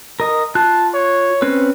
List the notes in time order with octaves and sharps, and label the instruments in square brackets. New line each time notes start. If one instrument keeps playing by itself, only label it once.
[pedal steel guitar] A#4 D#5
[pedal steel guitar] F4 F#6 [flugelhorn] A5
[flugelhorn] C#5
[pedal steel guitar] C4 C#4 B4